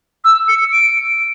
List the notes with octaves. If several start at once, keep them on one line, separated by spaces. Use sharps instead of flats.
E6
C#7
D7